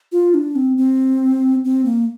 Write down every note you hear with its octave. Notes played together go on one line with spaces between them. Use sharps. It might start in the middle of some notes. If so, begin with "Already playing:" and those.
F4
D4
C4
C4
C4
A#3